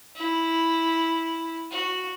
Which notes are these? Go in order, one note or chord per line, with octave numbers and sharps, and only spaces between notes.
E4
F#4